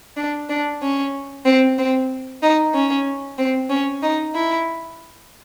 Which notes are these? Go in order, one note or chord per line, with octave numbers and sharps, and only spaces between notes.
D4
D4
C#4
C4
C4
D#4
C#4
C4
C#4
D#4
E4